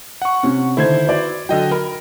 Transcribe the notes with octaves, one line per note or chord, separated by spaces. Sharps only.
F#5 C#6
C3 C#4
D3 D#3 E4 A4 C5 G#6
F#4 B4 D5
D3 F#3 D#5 G5
A#4 B5